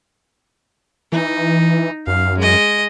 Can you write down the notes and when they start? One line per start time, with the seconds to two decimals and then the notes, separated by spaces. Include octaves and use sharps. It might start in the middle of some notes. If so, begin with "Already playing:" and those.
1.12 E3 D#4
2.07 F#2 F5
2.38 G#3 D#5